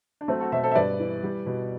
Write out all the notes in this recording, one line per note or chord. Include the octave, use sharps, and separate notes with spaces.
D4
F#3 A3 C4
F#4 A4
B2 C5 E5
A4 C5
E5
G2 B4 D5
E3
G3
B2